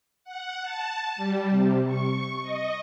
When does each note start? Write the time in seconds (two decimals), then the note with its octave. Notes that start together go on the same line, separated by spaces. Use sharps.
0.24 F#5
0.62 A5
1.16 G3
1.51 C3
1.86 C#6
2.42 D#5